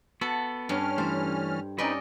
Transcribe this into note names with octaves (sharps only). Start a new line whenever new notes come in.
B3 F#4 A4
G2 C#4 F6
E3 G3 A3 C5
C4 C#4 D#4 B4 D5 D#5